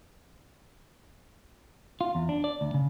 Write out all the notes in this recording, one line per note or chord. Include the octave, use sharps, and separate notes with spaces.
F4
E2
D4
D5
D2
C#3